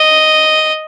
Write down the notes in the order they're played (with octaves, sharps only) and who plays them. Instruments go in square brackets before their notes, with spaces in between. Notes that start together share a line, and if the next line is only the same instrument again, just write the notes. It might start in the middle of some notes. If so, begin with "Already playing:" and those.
Already playing: [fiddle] D#5